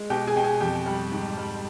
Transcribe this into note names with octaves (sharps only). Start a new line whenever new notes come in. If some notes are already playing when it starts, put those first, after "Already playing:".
Already playing: G#3
B2 G4 G5
G#4 G#5
B2 G5
G#4 G#5
F2 G4 G5
G3
G#2
G3